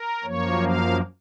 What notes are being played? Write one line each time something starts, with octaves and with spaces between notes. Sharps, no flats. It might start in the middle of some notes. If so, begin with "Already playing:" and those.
Already playing: A#4
F#2 F3 A#3 C#5
F5